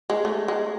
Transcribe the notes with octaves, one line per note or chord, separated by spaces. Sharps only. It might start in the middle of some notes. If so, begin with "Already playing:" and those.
G#3
A3
G#3